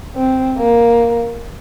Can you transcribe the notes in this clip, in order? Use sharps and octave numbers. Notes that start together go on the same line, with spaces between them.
C4
A#3